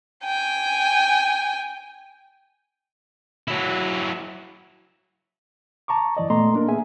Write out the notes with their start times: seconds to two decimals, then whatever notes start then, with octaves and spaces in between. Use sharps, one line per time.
0.25 G5 G#5
3.48 F#3 E4
5.88 A5 A#5 C#6 D6
6.17 F#2 E3 D5 D#5
6.30 A#2 A3 B3 D#5 A#5 C6
6.54 A#3 D4 A#4
6.68 B3 G#4 E5 G#5